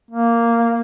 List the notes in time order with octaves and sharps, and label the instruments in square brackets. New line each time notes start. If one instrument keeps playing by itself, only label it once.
[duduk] A#3